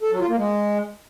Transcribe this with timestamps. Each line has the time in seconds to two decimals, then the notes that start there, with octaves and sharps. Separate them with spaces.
0.03 A4
0.11 F#3
0.20 F4
0.29 A#3
0.38 G#3